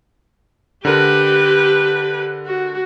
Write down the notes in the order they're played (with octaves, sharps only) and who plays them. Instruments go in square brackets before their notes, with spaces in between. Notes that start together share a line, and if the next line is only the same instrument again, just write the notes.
[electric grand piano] D3 A#4 [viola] G4 B4
[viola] F#4